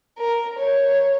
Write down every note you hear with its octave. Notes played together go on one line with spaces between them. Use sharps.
A#4
C#5